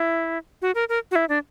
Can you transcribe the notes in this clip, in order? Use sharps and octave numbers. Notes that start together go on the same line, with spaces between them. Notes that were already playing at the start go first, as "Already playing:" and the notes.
Already playing: E4
F#4
A#4
A#4
F#4
E4
D4